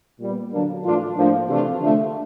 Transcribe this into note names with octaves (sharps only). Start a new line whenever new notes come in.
A#2 G3 B3
D3 F#3 A#3 D4
A2 E3 A3 D4 F4
A2 F3 A#3 D4
C3 E3 A3 D4 F4
D3 F3 A3